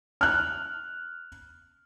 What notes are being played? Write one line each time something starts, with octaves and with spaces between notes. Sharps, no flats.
F6 F#6